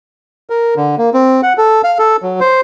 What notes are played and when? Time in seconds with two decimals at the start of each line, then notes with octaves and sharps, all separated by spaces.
0.50 A#4
0.77 D3
0.98 A#3
1.14 C4
1.43 F#5
1.58 A4
1.84 F5
1.99 A4
2.23 F#3
2.41 C5